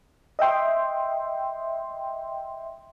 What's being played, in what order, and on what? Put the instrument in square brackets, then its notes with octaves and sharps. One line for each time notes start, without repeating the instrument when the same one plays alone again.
[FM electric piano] D#5 E5 G5 C6